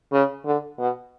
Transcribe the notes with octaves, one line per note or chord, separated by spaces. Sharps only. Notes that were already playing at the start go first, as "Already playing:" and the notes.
C#3
D3
B2